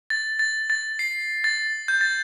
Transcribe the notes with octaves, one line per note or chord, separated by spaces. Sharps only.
A6
A6
A6
C7
A6
G6
A6